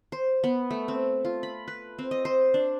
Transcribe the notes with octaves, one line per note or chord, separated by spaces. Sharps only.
C5
B3
A3
C4
F4
B5
B4
C4
D#5
C5
D4